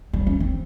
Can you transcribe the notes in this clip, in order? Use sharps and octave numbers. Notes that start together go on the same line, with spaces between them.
G3
C#4
C4